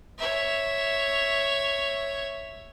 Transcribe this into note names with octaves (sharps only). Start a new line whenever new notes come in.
C#5 E5